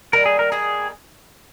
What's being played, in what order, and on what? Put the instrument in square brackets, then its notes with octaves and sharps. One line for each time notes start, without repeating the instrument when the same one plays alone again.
[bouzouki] D#3 G3 A#3 [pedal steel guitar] A#4
[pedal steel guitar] G#4
A#4
[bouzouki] D#3 G3 A#3 [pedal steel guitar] G#4